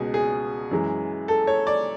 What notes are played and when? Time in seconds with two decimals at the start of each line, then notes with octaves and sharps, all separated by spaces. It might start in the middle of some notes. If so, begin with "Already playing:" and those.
Already playing: C#2 B2 G#3 G#4
0.14 G#4
0.71 F#2 E3 G#3
1.28 A4
1.47 C#5
1.67 D5